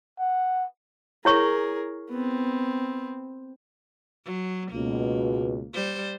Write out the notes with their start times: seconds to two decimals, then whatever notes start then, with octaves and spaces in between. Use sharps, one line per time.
0.19 F#5
1.25 E4 G#4 A#4 C#5 C#6
2.10 B3 C4
4.25 F#3
4.71 C#2 B2 A#3
5.74 G3 C5